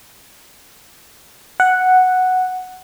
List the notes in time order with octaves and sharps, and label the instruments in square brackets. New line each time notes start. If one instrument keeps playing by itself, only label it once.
[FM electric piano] F#5